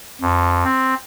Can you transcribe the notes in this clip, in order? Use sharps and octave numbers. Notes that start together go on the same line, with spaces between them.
F2
C4